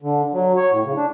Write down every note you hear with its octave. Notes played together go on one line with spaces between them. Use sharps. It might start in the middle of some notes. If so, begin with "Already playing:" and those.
D3
F#3
C#5
A2
C#3
D4